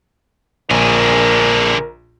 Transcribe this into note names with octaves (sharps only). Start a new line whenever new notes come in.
A#1 D3 G#4 A#4